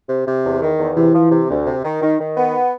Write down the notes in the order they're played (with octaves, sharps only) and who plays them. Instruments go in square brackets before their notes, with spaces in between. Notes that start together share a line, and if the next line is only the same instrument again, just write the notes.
[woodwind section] C3
C3
E2
D#3
E2
[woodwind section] C3 [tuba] E3
[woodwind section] F3
C3
D2
C3
D#3
D#3
D#3
B3